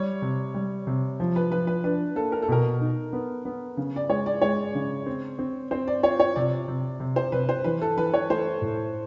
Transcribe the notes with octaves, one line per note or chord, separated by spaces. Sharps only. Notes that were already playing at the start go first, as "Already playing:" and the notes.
Already playing: G3 C#5
C3
G3
C3
F3
B4
F3 B4
B4
D4 B4
A#3 A4
A#4
A4
B2 A#4
D#4
B3
B3
C#3
D5
G#3 C#5
D5
G#3 C#5
C#3
C4
C4
C4 C5
D5
F4 C#5
C#5
C3 D5
C3
C3
C5
C3 B4
C5
E3 B4
A4
E3 B4
C#5
A3 C5
A2